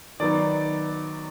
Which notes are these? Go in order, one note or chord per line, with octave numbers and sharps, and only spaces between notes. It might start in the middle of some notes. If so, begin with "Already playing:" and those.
D#3 F#3 B3 D#4 D5